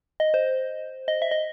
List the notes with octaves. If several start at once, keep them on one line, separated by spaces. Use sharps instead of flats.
D#5
C5
D#5
E5
D#5